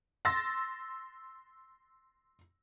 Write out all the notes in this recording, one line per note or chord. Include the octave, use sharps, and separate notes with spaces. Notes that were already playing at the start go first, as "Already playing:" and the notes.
C6 E6 A6 A#6